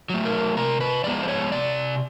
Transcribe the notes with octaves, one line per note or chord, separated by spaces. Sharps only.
F#3 A3
A#4
C3 A#4
B4
F3 G#3 B3 D5
C5
C#5
C3 D5